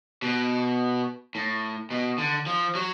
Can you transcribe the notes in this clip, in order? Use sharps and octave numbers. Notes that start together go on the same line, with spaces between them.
B2
A2
B2
D3
F3
F#3